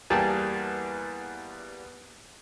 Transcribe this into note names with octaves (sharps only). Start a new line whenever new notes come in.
E2 G3 A#3 G#4 G5 A5